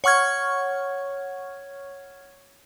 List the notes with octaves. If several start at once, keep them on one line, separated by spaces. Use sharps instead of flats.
C#5 F#5 C#6 F6 G#6